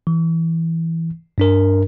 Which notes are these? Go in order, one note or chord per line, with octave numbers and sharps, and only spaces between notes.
E3
G2 D4 A#4